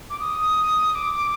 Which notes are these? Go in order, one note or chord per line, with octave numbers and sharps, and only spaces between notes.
D6
D#6
D6